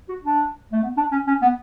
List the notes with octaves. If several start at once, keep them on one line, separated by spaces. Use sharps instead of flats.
F#4
D4
A3
B3
D4
C#4
C#4
B3